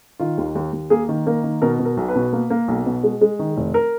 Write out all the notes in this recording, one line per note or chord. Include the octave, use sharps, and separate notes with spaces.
D#3 F4
D#2
D#2
D#2
A#3 G#4
D#3
A#3 A#4
D#3
B2 A#4
B2
A#4
B1
B4
B2
A#3
A#3
B1
B2
G#3
G#3
D#3
F1
A#4